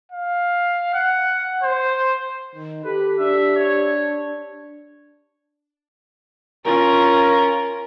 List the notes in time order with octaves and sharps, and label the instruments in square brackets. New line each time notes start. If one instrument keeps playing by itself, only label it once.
[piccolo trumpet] F5
F#5
C5
[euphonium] D#3
[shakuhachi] G4 [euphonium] A4 [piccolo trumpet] B4
[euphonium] D4 [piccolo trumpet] E5
[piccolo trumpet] C#5
[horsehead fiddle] C#4 F4 [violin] A#4